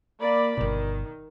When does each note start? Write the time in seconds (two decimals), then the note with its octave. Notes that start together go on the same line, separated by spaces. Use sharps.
0.19 A#3 D5 B5
0.57 G1 B2 D#3